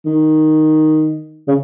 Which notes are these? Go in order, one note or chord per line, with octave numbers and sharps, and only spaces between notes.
D#3
C#3